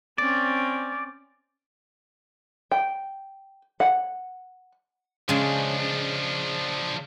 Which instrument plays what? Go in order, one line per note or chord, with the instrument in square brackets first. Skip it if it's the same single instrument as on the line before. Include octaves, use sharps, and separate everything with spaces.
[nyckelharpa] C4 C#4 [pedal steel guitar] D5
[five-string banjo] G5
F#5
[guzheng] C#3 G#3 [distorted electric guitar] F3 D4